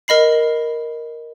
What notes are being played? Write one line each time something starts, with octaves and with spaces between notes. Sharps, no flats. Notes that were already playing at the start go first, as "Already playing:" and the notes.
A#4 D#5 B5 C7